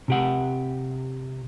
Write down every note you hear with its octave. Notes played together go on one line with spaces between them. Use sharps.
C3 G4 F#5